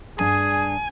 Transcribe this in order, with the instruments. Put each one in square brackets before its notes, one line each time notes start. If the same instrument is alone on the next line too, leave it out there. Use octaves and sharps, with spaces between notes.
[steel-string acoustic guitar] G2 D4 [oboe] G#4 [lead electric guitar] G#5